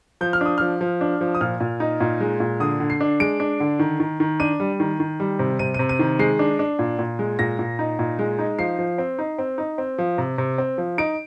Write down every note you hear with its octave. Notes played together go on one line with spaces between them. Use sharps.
F3 G6
F6
D4 D#6
F3 F6
F3
D4
F3
D#6
A#2 F6
A#2
D#4
A#2
G#3
A#2
D3 D#6
D3
C7
D4
G#3 D7
D4
D3
D#3
D#3
D#3
D4 D#7
G3
D#3
D#3
G3
C3
C3 D#7
C3 D#7
D#7
D#3
G#3 C7
D4
D4
A#2
A#2
G#3
A#2 A#6
A#2
D#4
A#2
G#3
D#4
F3 C7
F3
C4
D#4
C4
D#4
C4
F3
C3
C3
C4
F3
D#4 D7